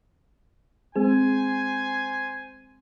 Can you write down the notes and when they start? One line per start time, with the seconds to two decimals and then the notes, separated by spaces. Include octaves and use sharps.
0.96 G#3 C4 G#4 C5 G#5